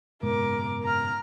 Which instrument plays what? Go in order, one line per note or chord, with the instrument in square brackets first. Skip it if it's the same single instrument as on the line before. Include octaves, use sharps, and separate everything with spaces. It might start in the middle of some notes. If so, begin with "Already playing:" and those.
[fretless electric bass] F#1 G#2 B2 [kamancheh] A#4 D6
[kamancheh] A#5 F6